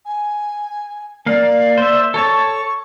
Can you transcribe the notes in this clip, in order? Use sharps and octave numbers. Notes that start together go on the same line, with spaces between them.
G#5
A#3 D5 F5
C5 E5
A4 C#5 A5 C#6